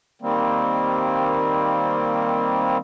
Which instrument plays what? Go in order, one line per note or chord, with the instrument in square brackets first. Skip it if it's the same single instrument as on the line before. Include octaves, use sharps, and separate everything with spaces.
[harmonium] D#3 G3 A#3 C4